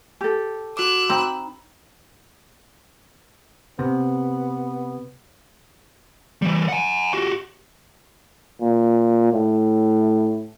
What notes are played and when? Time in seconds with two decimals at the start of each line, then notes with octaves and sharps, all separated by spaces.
0.21 G4 A4
0.77 F#4 D6 E6 F#6
1.10 C4 D#4 B5
3.79 C3 B3
6.42 E3 G3
6.68 F#5 G#5
7.13 F#4 G4
8.60 A#2
9.33 A2